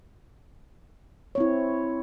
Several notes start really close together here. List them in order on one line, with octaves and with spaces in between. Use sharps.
C#5 C4 E4